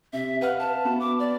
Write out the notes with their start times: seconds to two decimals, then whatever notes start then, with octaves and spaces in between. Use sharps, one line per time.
0.13 C3 E5
0.41 B4 F5 F#5 F6
0.59 A5
0.85 B3 F#4
1.00 D6
1.19 D5